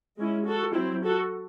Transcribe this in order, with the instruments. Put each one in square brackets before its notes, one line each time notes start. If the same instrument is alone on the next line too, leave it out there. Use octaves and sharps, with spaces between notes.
[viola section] G#3 C#4 E4
F#4 A4
F#3 C4 E4
F#4 A4